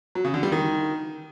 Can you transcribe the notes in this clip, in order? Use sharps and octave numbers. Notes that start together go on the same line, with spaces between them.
F#3
C#3
D3
G3
D#3